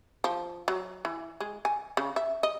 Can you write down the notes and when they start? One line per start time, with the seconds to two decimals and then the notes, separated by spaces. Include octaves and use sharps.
0.24 F3
0.68 F#3
1.05 E3
1.40 G#3
1.65 G#5
1.97 C#3
2.16 E5
2.43 D#5